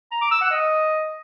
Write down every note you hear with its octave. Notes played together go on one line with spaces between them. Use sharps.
A#5
D6
E6
F#5
D#5